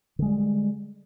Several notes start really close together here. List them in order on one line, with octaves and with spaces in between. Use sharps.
D3 G#3 G3